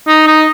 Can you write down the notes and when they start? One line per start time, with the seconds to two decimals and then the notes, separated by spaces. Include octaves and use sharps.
0.08 D#4
0.27 D#4